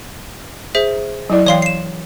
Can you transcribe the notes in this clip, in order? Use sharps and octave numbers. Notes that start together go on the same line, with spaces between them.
G#4 C5 E5
F#3 E4 D5
E3 C#5 F5 G5 C6 C7
C7 E7